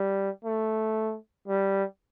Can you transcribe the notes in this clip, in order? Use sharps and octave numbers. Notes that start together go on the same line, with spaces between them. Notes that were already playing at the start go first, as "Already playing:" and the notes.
Already playing: G3
A3
G3